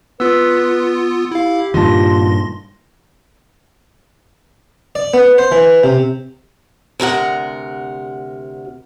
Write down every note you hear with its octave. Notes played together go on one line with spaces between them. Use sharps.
B3 F4 B4 E6
E4 G4 F5
G2 A#2 D#3 F4 A5 C6 A#6
D5
B3
C5
E3
C3
D2 C3 A#4 F#5